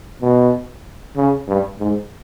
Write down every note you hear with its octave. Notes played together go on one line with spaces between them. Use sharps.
B2
C#3
G2
G#2